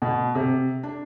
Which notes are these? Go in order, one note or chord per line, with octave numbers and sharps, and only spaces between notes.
B2
C3
D4